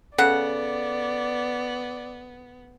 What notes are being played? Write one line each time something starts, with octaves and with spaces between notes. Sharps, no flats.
C#3 B3 A4 D5 F#5